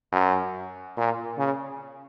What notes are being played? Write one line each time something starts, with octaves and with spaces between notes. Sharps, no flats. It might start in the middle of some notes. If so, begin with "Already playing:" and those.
F#2
A#2
C#3